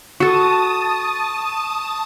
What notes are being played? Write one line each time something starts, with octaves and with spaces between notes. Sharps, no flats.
F#4 A4 A5 C#6 D#6